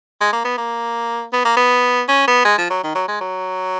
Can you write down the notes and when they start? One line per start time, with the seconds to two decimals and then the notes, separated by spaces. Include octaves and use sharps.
0.21 G#3
0.33 A#3
0.45 B3
0.57 A#3
1.33 B3
1.45 A#3
1.56 B3
2.08 C#4
2.27 B3
2.45 G#3
2.58 F3
2.70 F#3
2.84 D#3
2.95 F#3
3.08 G#3
3.21 F#3